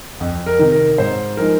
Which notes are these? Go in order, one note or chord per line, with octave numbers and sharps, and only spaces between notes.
F2
A#4
C3 D#3
A#4
G#2 C5
F3 G#3 D#4 A#4